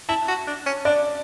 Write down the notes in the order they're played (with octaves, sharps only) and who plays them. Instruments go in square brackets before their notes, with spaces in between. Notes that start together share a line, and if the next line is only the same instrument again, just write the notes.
[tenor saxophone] E4 [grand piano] A5
[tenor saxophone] F#4
D4
C#4
[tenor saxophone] D4 [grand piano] D5